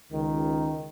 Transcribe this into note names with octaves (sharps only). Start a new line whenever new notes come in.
C#2 D#3